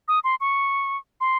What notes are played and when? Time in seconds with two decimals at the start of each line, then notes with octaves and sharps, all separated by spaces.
0.08 D#6
0.24 C6
0.41 C#6
1.21 C6